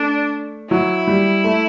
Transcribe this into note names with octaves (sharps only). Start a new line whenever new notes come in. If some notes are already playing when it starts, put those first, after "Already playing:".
Already playing: A3 D4
F#3 E4
G3
A3